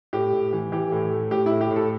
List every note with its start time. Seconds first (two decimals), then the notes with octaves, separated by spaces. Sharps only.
0.13 A2 G4
0.33 A2
0.53 E3
0.72 E3 G4
0.92 A2
1.12 A3
1.31 A2 G4
1.46 A2 E4
1.61 G4
1.71 A2
1.76 A4